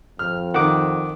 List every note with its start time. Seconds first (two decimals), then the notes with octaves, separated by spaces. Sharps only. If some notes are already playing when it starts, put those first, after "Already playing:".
0.19 F2 F6
0.54 D#3 F#5 D6